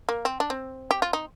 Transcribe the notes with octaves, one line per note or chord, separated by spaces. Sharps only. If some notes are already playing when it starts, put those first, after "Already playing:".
A#3
C4
D4
C4
G4
F4
D#4